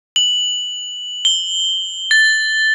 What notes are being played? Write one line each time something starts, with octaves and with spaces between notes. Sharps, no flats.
F#7
G7
A6